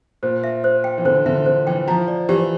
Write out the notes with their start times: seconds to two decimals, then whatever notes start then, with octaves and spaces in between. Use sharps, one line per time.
0.23 A#2 C5
0.44 E5
0.64 C5
0.84 G5
0.98 E3
1.05 D3 C5
1.26 D3 E5
1.46 D3 C5
1.67 E3 G5
1.88 F3 A#5
2.08 D5
2.29 E3 G4